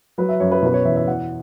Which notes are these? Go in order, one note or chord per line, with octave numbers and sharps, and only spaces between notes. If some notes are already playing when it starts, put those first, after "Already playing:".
F#3 B4
E5
F#2 C#5
B4
B2 B4
C#5
E2 E5
E5
E2 F#5